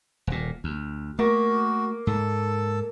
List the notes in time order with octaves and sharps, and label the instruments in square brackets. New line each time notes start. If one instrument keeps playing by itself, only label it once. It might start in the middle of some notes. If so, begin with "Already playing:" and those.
[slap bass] D#1 A#2
D2
[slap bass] A3 [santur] A#3 [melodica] F#4
[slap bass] G#2 [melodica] A4